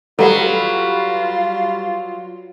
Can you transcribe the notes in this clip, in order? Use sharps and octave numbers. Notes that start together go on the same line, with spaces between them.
F#3 G3 F4 A4 B4 D5 F#5